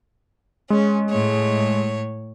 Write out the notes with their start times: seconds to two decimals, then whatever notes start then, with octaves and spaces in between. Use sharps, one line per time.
0.70 G#3 C#4
1.08 A2 C#5